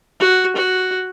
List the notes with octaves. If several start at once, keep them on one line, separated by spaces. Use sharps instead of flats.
F#4
F#4